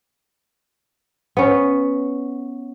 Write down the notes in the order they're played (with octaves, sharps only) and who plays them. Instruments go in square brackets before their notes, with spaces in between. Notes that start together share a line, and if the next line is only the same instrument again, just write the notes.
[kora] B3 C#4